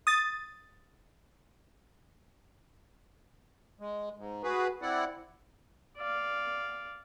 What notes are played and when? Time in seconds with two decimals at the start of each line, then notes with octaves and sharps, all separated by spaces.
0.07 D#6 A6
3.80 G#3
4.18 G#2
4.44 F#4 G#4 B4
4.82 C4 E4 D5 F#5
5.97 D5 F5